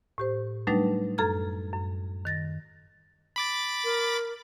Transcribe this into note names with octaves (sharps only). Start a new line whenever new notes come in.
A2 G4 C5
F#3 G3 A3 D4 D#4 B4
F#2 A4 A#5 F6 G#6
F#2
D#3 A6 A#6
B5 D6 A6
A#4